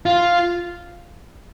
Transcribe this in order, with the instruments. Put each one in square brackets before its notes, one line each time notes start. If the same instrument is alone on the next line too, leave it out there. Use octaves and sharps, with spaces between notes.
[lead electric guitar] F4